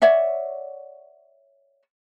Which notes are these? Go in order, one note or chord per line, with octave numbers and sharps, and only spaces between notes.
C#5 D5 E5 F#5